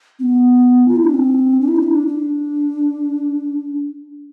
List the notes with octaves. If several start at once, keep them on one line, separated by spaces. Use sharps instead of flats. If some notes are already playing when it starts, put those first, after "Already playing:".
C4
B3
F4
E4
D4
C4
D4
E4
D4
E4
D4
D4